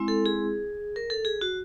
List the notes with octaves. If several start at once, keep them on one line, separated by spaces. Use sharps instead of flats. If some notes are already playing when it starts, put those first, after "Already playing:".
Already playing: G#3 C4 E4
A4
G#4
A#4
A4
G#4
F#4